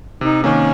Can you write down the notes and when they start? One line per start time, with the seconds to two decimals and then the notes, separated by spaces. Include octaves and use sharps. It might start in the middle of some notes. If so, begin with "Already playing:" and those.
0.21 C3 D#4
0.43 D#3 A#3 C#4